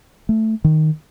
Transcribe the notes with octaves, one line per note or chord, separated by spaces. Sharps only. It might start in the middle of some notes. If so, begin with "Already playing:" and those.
A3
D#3